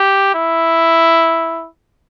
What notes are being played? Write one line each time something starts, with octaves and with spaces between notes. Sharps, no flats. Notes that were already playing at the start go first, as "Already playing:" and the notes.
Already playing: G4
E4